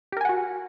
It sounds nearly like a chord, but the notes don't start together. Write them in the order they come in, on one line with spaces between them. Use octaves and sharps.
G4 A#4 G#5 F#5 F#4